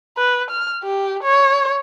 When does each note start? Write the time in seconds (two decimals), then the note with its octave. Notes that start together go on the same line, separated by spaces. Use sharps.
0.17 B4
0.51 F6
0.83 G4
1.23 C#5